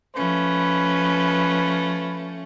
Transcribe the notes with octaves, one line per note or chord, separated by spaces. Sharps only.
F3 A3 C#4 B4